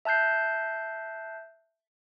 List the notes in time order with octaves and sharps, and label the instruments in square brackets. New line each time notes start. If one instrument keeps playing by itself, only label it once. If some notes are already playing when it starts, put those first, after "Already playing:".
[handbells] E5 A5 F#6 G6 C7